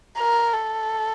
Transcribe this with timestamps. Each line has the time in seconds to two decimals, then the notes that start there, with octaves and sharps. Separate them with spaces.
0.18 A#4
0.54 A4